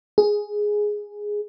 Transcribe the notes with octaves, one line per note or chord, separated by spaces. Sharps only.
G#4